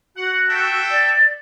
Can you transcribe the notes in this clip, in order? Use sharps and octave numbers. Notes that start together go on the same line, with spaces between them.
F#4 F#5
A4 E5 G5
D5